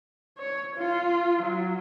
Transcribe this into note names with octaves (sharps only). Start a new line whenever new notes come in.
C#5
F4
F#3